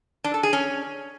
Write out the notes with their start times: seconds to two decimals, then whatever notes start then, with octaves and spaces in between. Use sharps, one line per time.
0.24 D4
0.34 A4
0.43 G#4
0.53 C#4